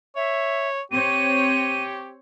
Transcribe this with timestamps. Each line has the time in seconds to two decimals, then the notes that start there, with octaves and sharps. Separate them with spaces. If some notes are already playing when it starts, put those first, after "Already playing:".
0.16 C#5 E5
0.92 C4 G4 C#5 D#7